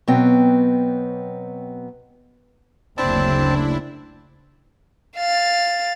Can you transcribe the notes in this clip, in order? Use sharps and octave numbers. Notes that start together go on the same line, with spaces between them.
B2 F#3 B3 C4 G5
F#1 D2 C#3 C4 D4 E4 A5
F5 A6